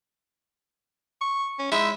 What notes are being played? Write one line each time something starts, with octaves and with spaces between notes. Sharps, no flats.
C#6
C#4
G#3 D#4 E4 E5